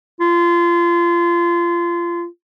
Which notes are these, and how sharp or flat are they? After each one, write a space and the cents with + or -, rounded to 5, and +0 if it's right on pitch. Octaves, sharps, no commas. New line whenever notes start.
F4 -25